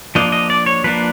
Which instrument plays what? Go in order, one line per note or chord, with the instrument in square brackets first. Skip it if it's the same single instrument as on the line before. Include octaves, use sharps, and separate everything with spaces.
[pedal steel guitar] F3 A#3 D4 D#5
D#5
D5
C#5
F3 A#3 D4 B4